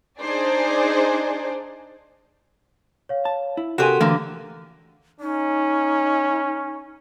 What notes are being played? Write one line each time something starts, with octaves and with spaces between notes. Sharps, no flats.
D4 D#4 G#4 C5 D5
C#5 F5
A5
E4
C3 F#4 G4 A4 A#4 C#5 G#5 C6
D3 E3 A3 A#3
C#4 D#4